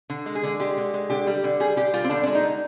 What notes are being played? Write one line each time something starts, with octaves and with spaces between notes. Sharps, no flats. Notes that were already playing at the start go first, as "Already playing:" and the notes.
D3
G#3
G#4
D3
G#3 G4
D3
G#3
D3 G4
G3
D3
G3 G#4
D3 G4
G3 F4
C4
D3 D4
G#3 D4
D#4
D3